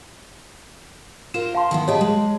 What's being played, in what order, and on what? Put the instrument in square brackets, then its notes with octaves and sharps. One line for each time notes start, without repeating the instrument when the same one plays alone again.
[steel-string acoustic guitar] F4 A#4 C5 [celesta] E7
[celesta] F5 A5 C6
[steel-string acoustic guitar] D#3 E3 B3
[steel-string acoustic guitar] G4 G#4 B4 [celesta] C#5 D#5 A5
[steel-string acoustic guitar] G#3